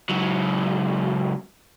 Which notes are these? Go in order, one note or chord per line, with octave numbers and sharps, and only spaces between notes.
C#2 F#3